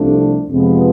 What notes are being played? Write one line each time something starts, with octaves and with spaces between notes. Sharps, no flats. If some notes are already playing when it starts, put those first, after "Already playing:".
Already playing: C2 C3 F3 A3 D4
F2 C3 F3 G#3 B3